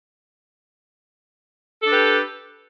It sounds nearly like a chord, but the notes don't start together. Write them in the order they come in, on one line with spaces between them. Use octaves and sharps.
A4 D4 B4 G4